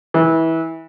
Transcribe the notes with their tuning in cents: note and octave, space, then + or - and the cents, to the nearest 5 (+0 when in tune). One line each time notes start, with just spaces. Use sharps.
E3 -20